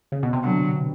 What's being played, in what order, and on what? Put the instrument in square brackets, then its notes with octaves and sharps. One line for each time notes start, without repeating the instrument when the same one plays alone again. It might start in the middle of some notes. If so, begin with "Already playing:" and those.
[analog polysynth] C#3
B2
C3
[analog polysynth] D3 [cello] F#3